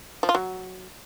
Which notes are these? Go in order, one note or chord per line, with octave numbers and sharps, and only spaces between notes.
F3
F4
F#3